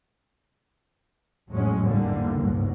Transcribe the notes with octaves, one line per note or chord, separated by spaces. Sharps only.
A1 F2 A2 F#3 G#3 C#4
E2 G#2 D3 G3 A#3
G1 C#2 G#2 B2 F#3